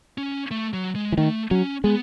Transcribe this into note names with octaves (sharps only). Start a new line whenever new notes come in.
C#4
A3
F#3
G#3
E3
D#3 A3
F#3 C#4
G#3 B3